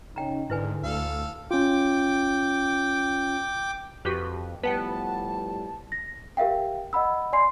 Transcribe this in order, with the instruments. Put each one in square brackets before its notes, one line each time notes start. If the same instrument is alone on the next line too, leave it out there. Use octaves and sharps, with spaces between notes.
[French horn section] C#3 C#4 D#4 [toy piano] G5 A#5
[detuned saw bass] G#2 [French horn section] D3 D4 [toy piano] E4 B4 G#5
[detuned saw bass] D2 [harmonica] A4 F5
[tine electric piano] C#4 F4 [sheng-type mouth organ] G5 D6
[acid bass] F2 [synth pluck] F#4 G4 B4
[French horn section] A2 F3 G3 [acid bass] B3 [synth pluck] B4 F#5 G5 [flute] A5
[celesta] A#6
G4 A#4 E5 F5 G5
D#5 F#5 B5 E6
D5 G#5 C6 C7